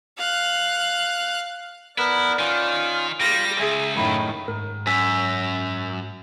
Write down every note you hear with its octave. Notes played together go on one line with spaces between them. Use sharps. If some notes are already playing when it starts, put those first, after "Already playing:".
F5 F#6
B3 E4 A#4 B4 D5
D#3 C#4 F4
G3 F4 A#6
C#2 G#4 E5
F#2 A2 D#3 E4
G#2 A#4
F#2 G#5 E6 B6